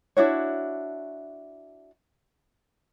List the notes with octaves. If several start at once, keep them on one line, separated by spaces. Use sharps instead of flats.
D4 E4 F#4 C#5